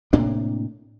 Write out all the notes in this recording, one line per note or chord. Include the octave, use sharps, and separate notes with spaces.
A2 C3 A#3 D4